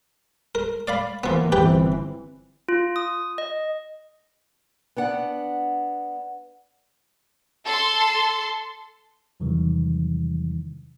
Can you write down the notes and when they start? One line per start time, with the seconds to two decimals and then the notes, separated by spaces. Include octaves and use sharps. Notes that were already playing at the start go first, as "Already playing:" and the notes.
0.55 A#4
0.88 D5 F5 B5
1.24 E3 F3 A#3 B3
1.52 G1 E3 C4 G4 B4 G5
2.69 F4
2.96 D#6
3.38 D#5
4.97 B3 D4 F#5
7.66 A4 C6
9.40 E2 C3 D#3 E3 F#3 G3